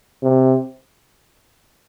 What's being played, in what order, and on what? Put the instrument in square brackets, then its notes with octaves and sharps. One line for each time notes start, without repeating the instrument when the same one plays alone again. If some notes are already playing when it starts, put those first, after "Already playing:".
[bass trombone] C3